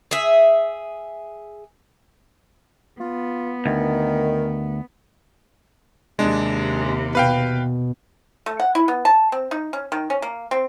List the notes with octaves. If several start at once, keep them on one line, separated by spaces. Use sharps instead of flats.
G#4 E5
B3 F4
D2 D#3 A#4
D#2 C3 G#3 D4
B2 B4 F5 G5
A3
F#5
E4
B3
A5
C4
D#4
C#4
D#3
C#4
A#3
C4